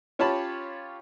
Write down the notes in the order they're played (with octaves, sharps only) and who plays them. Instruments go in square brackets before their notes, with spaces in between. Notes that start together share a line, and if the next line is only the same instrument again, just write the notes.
[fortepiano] C#4 F4 G4 C#5 A5 B5